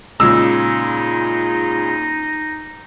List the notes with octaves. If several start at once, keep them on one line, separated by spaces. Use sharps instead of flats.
A#2 C#3 G#3 D#4 E6